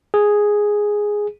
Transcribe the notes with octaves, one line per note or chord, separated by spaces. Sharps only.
G#4